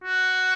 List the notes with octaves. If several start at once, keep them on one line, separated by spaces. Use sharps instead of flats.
F#4